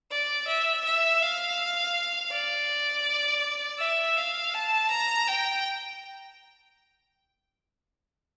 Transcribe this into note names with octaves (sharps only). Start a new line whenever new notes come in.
D5
E5
E5
F5
D5
E5
F5
A5
A#5
G5